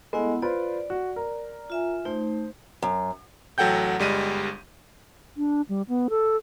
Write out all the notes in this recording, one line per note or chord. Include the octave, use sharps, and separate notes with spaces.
G#3 A3 B3 E4 F#5
F4 B4 C5 D5
F#4
A#4
F4 E5 G#5
A3 D#4 C5
F#2
A1 F#3 A4 F#5 G5 G6
G1 G3 G#3 D#7
D4
G3
B3
A4